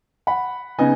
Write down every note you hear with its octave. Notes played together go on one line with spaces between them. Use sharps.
F#5 B5
C#3 B3 D#4 D#5 G#5